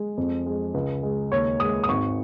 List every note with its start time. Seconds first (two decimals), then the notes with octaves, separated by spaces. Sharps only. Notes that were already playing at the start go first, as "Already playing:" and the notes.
Already playing: G#3
0.17 F2
0.46 G#3
0.74 C#2
1.03 G#3
1.32 D#2 C#5
1.60 G#3 D#6
1.83 D#6
1.89 G#1 C#6